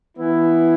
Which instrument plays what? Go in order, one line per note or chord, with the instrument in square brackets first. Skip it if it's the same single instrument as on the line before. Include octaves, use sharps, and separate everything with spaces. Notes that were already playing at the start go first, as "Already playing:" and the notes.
[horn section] E3 B3 E4